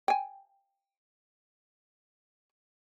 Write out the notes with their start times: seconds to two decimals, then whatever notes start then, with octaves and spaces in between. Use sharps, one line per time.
0.08 G5 G#5